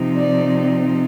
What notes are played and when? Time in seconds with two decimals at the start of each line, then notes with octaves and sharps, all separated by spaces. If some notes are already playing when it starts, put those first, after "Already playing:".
Already playing: C3 F3 C4 D#4
0.16 D5